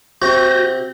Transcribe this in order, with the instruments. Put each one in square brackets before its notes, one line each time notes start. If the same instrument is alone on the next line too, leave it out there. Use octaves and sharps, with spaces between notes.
[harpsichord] C3 C4 [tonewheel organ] F#4 G6 A#6